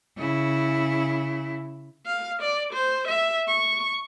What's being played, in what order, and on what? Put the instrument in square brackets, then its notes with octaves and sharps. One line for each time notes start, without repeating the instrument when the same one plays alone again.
[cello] C#3 E4
[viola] F5
D5
C5
E5
C#6